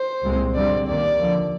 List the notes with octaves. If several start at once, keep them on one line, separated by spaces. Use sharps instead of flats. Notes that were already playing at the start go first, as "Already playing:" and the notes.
Already playing: C5
C2 A#2 G#3 C4
F2 D3 G3 C4 D5
D#2 D#3 A#3 D5
D#2 D3 F3